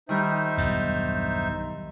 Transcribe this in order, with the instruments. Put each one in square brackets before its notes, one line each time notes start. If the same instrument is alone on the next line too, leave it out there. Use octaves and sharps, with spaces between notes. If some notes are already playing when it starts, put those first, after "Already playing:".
[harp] D#3 G3 [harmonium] D#4 C5 E5
[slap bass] B1 E2 G2